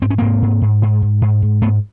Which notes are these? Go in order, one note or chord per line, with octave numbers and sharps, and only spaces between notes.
G#2 C4
C#4
G#2 A#3 C4
G#2
G#2
G#2
G#2
G#2
G#2
G#2 A3 B3